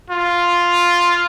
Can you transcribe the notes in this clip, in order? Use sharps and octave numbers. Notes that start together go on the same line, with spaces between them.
F4